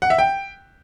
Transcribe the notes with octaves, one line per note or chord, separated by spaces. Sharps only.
F#5
E5
G5